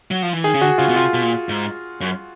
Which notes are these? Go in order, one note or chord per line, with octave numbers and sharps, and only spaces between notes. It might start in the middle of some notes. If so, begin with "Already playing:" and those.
F#3
F3
E3
D#3 G#4
C#3
D3 F#4
C#3 F4
B2
C3 F4
B2
A#2
G#2
F#2